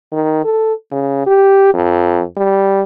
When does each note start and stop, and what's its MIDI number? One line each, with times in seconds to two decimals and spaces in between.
0.13 0.43 51
0.44 0.73 69
0.92 1.26 49
1.27 1.74 67
1.74 2.23 41
2.37 2.81 55